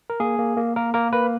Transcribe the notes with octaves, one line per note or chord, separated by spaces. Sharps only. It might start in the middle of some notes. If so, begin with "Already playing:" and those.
A#4
A#3 G#4
A#3
A#3
A#3 A#4
A#3 A#4
A#3 B4